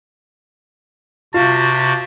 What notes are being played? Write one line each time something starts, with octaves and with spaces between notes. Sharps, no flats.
C3 F4 F#4 A5